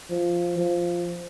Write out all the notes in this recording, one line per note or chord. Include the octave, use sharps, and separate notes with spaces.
F3
F3